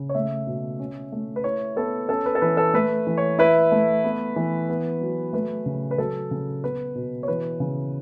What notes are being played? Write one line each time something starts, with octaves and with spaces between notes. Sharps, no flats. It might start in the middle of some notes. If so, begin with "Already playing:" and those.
Already playing: C#3
C#5
A3 E5
B2
C#4
A3
B4
E4 C#5
B3 A4
C#4 A4
B4
A4
E3 B4
A4
A3 B4
E3
C#5
E4 B4
A3
B3
E3
B3
F#3
A3 B4
C#3
B4
F#3 A4
C#3
B3 B4
B2
C#5
E3 B4
C#3